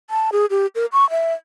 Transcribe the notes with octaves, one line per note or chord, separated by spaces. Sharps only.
A5
G#4
G4
A#4
C#6
E5